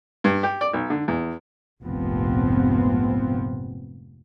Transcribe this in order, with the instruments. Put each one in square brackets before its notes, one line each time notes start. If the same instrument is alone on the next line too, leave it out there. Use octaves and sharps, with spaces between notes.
[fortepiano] G2
G4
D5
B1
D3
E2
[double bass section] F1 A#1 G#2 F3 B3 C4